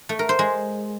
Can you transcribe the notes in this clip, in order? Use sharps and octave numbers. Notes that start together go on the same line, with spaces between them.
A3
A#4
C5
G#3